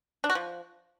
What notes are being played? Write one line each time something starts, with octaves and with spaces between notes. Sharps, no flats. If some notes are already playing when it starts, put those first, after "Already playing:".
D4
F#4
F3